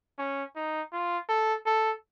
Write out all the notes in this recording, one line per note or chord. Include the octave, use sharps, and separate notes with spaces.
C#4
D#4
F4
A4
A4